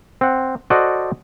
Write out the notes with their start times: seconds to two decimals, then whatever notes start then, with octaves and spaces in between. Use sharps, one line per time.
0.21 C4 F#5
0.70 F#4 A4 C5 D5 D#5 F#5